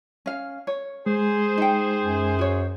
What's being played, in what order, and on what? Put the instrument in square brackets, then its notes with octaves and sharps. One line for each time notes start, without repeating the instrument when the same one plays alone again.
[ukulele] C#4 F5
C#5
[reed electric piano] G#3 [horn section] G#4 C5
[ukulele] D#4 G5
[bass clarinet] F#2
[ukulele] F#4 C#5